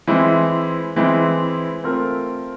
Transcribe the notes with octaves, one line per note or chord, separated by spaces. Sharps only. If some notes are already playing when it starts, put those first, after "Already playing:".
E3 G#3 C4 E4
E3 G#3 C4 E4
A3 C4 F4 A#4